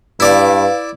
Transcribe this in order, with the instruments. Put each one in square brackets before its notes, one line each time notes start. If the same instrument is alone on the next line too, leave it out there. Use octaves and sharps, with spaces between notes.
[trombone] G2 [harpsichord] E4 D5 D6 [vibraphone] B4 F5